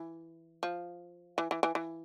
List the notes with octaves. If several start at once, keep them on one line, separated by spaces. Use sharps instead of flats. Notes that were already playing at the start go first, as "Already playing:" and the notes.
Already playing: E3
F3
E3
E3
E3
E3